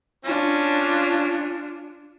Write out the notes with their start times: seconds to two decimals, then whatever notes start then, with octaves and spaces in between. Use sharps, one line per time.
0.25 C#4 D4 F4